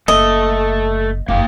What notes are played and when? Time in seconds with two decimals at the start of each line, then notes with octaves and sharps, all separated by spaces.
0.08 F#1 A3 A4 D#5
1.28 F#1 F2 A#3 F5 G5